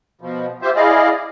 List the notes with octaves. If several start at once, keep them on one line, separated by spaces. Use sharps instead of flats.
B2 F3
F4 G4 C5 E5
E4 G#4 D5 D#5 F5